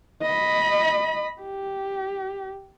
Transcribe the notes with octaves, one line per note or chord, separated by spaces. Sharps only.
D#5 B5
G4